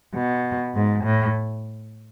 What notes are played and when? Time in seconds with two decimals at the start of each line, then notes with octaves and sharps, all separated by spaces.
0.15 B2
0.75 G#2
1.04 A2